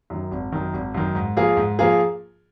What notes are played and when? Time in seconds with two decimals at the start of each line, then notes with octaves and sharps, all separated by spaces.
0.10 F#2 D#3
0.31 G#1
0.52 F#2 D#3
0.74 G#1
0.94 F#2 D#3
1.15 G#2
1.37 F3 A#3 F4 G#4
1.57 G#2
1.79 F3 A#3 F4 G#4